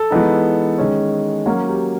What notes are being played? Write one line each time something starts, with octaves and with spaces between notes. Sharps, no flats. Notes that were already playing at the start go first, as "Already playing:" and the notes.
Already playing: A4
E3 G#3 B3 D#4
D#3 G#3 C#4
F#3 A#3 C#4 F#4
G4